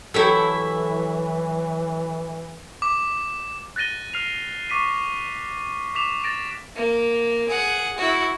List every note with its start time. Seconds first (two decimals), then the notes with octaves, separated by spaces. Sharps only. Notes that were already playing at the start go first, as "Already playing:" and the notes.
0.14 E3 F#3 E4 G4 A4 E5
2.82 D6
3.76 F#6 A6 A#6 D#7 G7
4.14 F6 C7 F7
4.70 C#6 D6 B6 D#7
5.95 D6 B6 E7 F7
6.24 A6 A#6 D7
6.76 A#3
7.49 G#4 F#5
7.98 E4 F#4